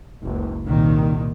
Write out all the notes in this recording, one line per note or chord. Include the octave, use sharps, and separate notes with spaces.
F#1 C#2
C2 A#2 D#3